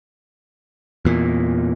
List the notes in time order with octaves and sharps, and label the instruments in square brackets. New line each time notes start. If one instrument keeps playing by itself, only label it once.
[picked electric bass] E2 A#2